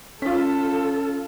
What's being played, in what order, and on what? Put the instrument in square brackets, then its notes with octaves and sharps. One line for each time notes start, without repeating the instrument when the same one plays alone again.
[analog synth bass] C#4 [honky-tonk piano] F4 B6 [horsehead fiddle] A4